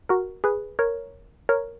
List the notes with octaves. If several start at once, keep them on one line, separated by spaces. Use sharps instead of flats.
F#4 A#4
G#4 B4
A#4 C#5
A#4 C#5